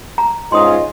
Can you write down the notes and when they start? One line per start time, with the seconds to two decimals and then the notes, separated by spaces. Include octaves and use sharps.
0.18 A#5
0.52 G#2 C#4 F4 G#4 D#5 C6 D#6